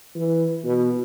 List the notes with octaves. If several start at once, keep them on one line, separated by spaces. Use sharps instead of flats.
E3
B2